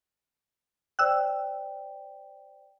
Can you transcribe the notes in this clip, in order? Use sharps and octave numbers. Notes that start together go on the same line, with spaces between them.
C5 D5 G5 E6 F#6